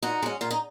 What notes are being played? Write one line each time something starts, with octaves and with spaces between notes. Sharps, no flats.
A#2 D#4 F#4
G#3 C#4
A#2 F4
D#4